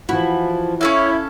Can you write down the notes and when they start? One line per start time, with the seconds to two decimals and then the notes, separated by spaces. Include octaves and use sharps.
0.09 E3 F3 E4 F#4
0.81 C#4 E4 A4 C#5 F5